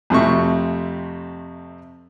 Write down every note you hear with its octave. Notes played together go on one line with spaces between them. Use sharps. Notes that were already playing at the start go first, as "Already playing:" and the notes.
F2 C3 A3 C#6